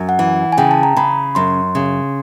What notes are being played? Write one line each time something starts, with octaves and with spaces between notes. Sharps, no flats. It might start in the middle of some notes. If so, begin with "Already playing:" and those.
Already playing: F#2
F#5
E3
G#5
C#3 G5
A5
A#5
C#3 B5
F#2 C6
C#3